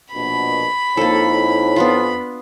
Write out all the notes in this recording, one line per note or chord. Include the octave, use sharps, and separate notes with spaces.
A#1 B2 B5
F2 A#3 D#4 E4 A4 C#5
B3 D4 F4